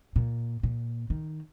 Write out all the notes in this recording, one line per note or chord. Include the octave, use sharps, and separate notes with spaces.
A#2
A#2
D#3